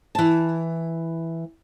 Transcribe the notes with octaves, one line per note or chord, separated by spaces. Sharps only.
E3 A5